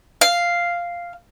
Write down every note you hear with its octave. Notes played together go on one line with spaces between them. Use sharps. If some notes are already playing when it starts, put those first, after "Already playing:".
F5